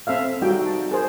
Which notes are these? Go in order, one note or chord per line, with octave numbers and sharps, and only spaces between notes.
C4 A4 E5 F5
G3 D#4 F#4 G5
A5
G#4 A#4 C5